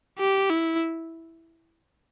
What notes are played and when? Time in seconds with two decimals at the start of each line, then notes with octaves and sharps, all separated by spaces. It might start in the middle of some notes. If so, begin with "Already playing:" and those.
0.19 G4
0.50 E4